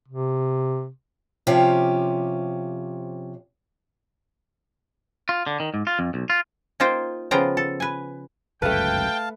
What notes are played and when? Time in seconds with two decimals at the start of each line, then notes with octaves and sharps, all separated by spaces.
0.08 C3
1.47 C3 F3 C#4 G4
5.29 F4
5.47 D3
5.60 D#3
5.74 G#2
5.87 F4
5.99 F2
6.14 B1
6.30 F4
6.80 A#3 D#4 F4 C5 G5
7.31 C#3 F3 B3 F4 G5 A#5
7.57 A4
7.80 B4 G#5
8.62 G1 C#2 F#2 A3 B4 F5 G5 A5